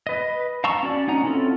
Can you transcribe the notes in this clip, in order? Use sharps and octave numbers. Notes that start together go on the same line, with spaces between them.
B4 D#5
F5 A5 A#5 C#6 E6
C#4 F#4 D5
C#4 D#4 F#5 A#5
C4 C#4 E4 F4 A4